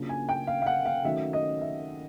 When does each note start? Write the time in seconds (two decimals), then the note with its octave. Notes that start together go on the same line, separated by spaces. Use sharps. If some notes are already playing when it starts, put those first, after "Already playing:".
Already playing: C#3 F#3 A#3 D4 F4
0.09 G#5
0.29 G5
0.47 F5
0.62 F5
0.66 F#5
0.85 F5
1.05 D#3 F#3 A3 C#4 E5
1.33 D#5
1.61 E5